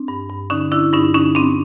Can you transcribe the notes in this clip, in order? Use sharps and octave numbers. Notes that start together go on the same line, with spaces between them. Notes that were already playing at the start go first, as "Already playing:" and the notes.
Already playing: C4 D4
G2
G2
D3 C#4 D#4
D3 D4 E4
G2 C#4 D#4
D3 C#4 D#4
G2 C4 D4